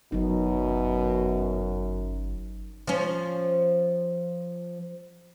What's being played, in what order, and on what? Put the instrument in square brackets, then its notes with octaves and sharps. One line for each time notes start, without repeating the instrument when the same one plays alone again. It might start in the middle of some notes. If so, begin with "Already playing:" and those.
[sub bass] G1 [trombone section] F#2 [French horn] B2 [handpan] F#3 D#4
[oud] F3 C#4